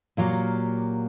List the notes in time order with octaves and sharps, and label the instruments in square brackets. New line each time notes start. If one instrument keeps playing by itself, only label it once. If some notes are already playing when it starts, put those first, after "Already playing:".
[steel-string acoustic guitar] A#2 F#3 A#3 G4